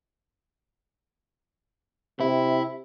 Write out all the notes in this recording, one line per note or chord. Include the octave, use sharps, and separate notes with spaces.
C3 E4